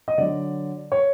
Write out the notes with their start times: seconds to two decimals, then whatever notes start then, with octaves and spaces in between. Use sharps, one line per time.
0.08 D#5
0.18 D3 F#3 D5
0.92 C#5